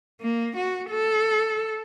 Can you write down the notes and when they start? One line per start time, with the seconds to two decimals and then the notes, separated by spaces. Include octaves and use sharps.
0.21 A#3
0.57 F#4
0.90 A4